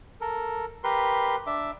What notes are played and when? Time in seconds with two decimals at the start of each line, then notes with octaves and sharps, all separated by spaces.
0.21 A4 A#4
0.84 G4 A#4 B4 C6
1.47 D4 E5 D6